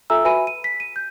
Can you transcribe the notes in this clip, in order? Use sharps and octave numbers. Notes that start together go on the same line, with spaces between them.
F4 A4 E5 G#5 A#5 E6
F#4 B4 E5 G#5 B5 D#7
D#7
B6
D#7
G6